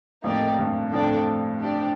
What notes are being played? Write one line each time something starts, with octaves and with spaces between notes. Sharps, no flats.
F2 A2 A#3 D#4 G4 D5
G2
F2 A2 D4 A4 D5 G5
D4 G4 D5